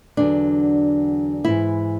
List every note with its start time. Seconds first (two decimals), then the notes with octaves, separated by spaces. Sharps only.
0.17 E2 D3 F#3 D4
1.44 G#2 E3 E4